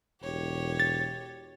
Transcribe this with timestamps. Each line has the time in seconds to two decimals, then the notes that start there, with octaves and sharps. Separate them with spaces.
0.22 E1 G4 C#5
0.80 A6